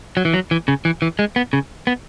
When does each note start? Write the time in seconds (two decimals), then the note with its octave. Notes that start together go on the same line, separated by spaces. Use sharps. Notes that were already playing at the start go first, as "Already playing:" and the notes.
0.17 F#3
0.25 E3
0.34 F#3
0.51 E3
0.68 C#3
0.85 E3
1.02 E3
1.19 G#3
1.36 B3
1.53 C#3
1.87 B3